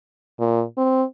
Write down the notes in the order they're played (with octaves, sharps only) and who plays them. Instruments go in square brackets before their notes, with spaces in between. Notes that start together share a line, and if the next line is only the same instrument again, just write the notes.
[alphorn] A#2
C4